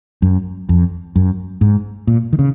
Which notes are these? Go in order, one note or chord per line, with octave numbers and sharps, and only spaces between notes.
F#2
F2
F#2
G#2
A#2
D#3
C#3